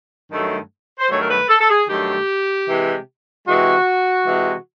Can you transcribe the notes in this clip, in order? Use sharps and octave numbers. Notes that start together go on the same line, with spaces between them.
G2 D#3 F#3 A3
C5
G2 D#3 F#3 A3 C#5
A#4
B4
A4
A4
G#4
G2 D#3 F#3 A3 G4
C3 E3 G#3
C3 E3 G#3 F#4
C3 E3 G#3